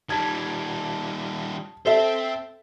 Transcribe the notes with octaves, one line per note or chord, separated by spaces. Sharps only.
D#3 G3 A5 G#6
C4 A4 C5 E5